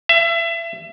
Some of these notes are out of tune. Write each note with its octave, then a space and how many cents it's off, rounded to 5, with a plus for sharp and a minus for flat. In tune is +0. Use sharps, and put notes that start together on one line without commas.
E5 +30